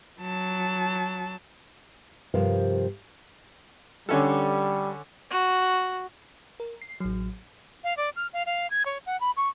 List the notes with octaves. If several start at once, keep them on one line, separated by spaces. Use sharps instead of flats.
F#3 A5
G2 C3 F3 A#4 F5
D3 G3 C#4 A4
F#4
A#4
C7
A1 F#3
F5
D5
F6
F5
F5
G#6
C#5
F#5
B5
C#6